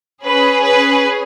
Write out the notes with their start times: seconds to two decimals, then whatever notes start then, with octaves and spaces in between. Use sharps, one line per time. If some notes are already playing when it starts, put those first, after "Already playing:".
0.24 C#4 G#4 B4
0.64 B4